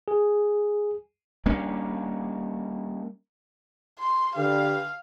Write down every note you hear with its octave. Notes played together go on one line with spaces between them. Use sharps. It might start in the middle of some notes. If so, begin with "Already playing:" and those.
G#4
G3 A#3 C#4 D4
C6
D3 G4 B4 F5